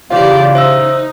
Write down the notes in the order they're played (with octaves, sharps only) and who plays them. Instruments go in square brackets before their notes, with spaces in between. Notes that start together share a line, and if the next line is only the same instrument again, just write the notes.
[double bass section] C#3 [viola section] E3 G4 D5 [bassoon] F4
[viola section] D#4 [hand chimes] C5 E5 E6